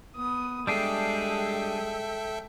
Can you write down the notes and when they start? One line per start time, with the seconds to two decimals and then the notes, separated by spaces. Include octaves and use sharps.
0.15 B3 D#6
0.67 G3 G#3 D4 G#4 A4 E5 G5